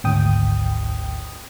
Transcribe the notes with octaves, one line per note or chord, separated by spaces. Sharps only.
G#1 D2 G5 D#6